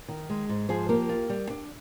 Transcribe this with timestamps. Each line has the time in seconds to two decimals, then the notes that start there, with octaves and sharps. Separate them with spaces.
0.08 D#3
0.30 G#3
0.49 G#2
0.69 F3 G#4 C5
0.89 A#3 G4 A#4
1.09 F4
1.30 G3
1.50 D4